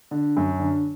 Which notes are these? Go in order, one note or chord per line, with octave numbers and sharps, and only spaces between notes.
D3
F#2
D3